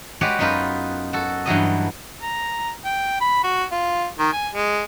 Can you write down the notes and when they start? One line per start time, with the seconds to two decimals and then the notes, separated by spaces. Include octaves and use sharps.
0.21 G#3 F#4 G4 B4 C#5 D5
0.39 F#2 B3 D#4 F4 B4
1.13 F#4 A4
1.46 G2 E3 F#3 D#5
2.23 A#5
2.85 G5
3.21 B5
3.44 F#4
3.72 F4
4.18 D#3
4.32 G#5
4.54 G#3